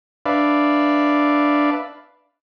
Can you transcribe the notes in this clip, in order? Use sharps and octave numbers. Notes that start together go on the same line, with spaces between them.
D4 B4 D5 E5 F5